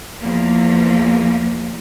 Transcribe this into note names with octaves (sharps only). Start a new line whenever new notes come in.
E2 F3 A#3